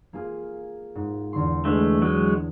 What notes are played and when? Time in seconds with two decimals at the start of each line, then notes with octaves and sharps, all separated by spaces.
0.13 A#3 F4 G#4
0.95 G#2
1.33 E2 D3 C6
1.65 G#3 A3 D4 B4
2.02 F#3 G#3